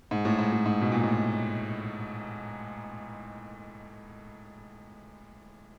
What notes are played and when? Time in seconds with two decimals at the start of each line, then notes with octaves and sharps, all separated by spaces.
0.11 G#2
0.25 A2
0.39 G#2
0.52 A2
0.66 G#2
0.81 B2
0.92 A#2
1.03 A2